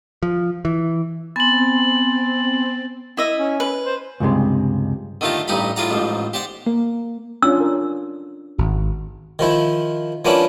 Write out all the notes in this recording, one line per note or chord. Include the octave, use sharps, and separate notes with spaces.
F3
E3
B3 C4 G#5 C6 A6 F#7
E4 D#5 E5
C#4
B4
C5
C#2 G2 C3 G#3
D3 D#3 A3 F4 G4 A#5
A1 G2 D#4 G4 A#5 B5
A2 F4 G#4 D5 F#5 A#5
A1 G#2 F3
G4 C5 D5 F#5
A#3
C#4 D4 F4 E6
A#4
G#1 F#4
D#3 F3 E4
F3 A#3 B3 C#4 D4 E4